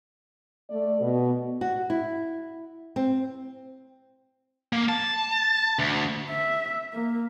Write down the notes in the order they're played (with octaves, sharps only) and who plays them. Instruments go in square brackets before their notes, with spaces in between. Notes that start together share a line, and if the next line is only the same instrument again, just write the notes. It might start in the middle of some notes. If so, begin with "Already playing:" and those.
[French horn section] A3 D5
B2
[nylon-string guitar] F#4
E4
C4
[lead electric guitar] A#3
A5
D2
[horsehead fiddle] E5
A#3